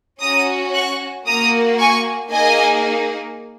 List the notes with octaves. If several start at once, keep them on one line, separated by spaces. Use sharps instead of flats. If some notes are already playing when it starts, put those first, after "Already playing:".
C#4 F#4 A#5 D#6
C#6 F#6
A#3 F#4 A#5 D#6
G#5 C#6
A#3 D#4 G#4 D#5 G#5